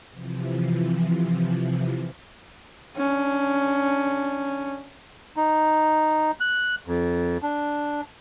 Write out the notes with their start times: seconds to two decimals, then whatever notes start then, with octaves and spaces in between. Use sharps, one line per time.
0.12 C3 E3 F3
2.97 C#4 D4
5.36 D#4
6.40 F#6
6.87 F2
7.42 D4